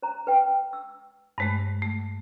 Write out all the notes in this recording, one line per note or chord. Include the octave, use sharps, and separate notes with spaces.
C5 A#5
B4 G5
E6
G2 G#3 A3 C5 A5
A3